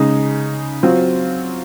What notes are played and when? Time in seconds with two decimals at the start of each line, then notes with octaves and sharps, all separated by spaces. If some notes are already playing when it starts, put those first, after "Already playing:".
Already playing: C#3 G#3 D#4
0.83 F#3 C4 F4